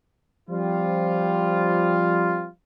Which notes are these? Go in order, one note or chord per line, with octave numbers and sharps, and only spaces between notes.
F3 G3 C4 F4